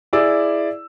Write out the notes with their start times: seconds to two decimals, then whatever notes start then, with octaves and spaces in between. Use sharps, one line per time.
0.13 E4 G#4 D5 D6 E6